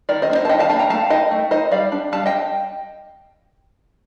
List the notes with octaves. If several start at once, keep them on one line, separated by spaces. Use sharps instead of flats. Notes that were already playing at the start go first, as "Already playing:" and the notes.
D#3 A#4 D5
C5 D#5
A#3 D4
C5 D#5
A5
D#3 D#5 G5
F5 A5
A#3 D4 F5 A5
G5 A#5
A3 F5 A5
D#4 D#5 G5
A3
D#4 C5 D#5
G3 D5 F5
D4
G3 F5 A5
D#5 G5